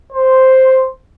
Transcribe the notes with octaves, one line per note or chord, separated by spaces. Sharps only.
C5